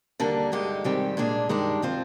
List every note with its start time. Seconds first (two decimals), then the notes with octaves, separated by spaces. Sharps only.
0.20 D#2 D3 G3 A#3 D4
0.52 G2 D3 G#3 D#4 G4
0.84 G#2 D#3 G3 C4 G4
1.17 A#2 G#3 D4 G#4
1.49 G2 D#3 G#3 D4 G4
1.82 F3 C4 F4